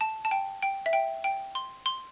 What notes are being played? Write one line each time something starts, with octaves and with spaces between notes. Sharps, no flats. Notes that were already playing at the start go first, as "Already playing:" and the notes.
A5
A5
G5
G5
E5
G5
G5
C6
C6